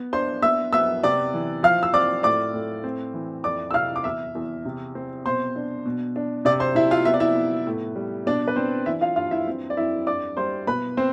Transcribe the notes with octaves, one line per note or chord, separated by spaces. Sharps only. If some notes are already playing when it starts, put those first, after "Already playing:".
Already playing: B3
D4 C5 C6
B3 E5 E6
B3 E5 E6
C3 D5 D6
E3
F3 F5 F6
E6
C4 D5 D6
A2 D5 D6
A2
C4
E3
F2 D5 D6
E6
C3 F5 F6
D6
E2 E5 E6
E2
C3
C4
B2 C5 C6
D4
B2
D4
C3 D5 D6
C5 C6
C3 E4 E5
F4 F5
B3 E5
D5
E4 E5
B3
A2
G3
B2 D4 D5
B4
C4 D4 C5
E3 E4 E5
F4 F5
G2 F4 F5
E4 E5
C4
D5
F2 E4 E5
G2 D5 D6
G3 C5 C6
B2 B4 B5
C4 C5